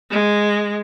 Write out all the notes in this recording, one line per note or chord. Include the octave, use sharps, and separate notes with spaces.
G#3